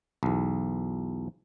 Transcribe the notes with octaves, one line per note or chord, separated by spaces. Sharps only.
B1 E2